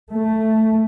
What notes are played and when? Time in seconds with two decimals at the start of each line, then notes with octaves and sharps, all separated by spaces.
0.12 A3